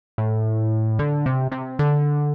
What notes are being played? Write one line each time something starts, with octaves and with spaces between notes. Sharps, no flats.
A2
D3
C3
C3
D3